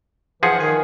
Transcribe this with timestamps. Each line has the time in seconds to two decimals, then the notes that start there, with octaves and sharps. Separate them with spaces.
0.43 E3 F3 G#4 F#5
0.60 D#3 G#5